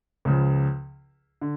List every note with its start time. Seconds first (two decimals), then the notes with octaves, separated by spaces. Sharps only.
0.25 C#2 C#3 F3
1.42 D3